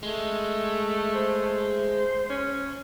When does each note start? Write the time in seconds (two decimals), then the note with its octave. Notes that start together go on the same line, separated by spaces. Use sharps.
0.03 G#3 A3
1.15 C5
2.30 C#4